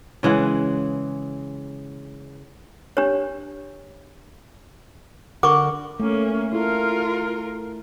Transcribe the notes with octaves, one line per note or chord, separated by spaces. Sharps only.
C#3 E3 G#3 F#5
D4 G4 C#5
D3 A#4 F#5 C#6 D6
A3 A#3 C#4
E4 F4 A4 A#4